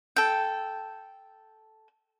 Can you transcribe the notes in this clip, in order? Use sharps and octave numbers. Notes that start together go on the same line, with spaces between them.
A4 G5